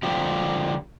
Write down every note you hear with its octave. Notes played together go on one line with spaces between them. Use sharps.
D3 F3 G4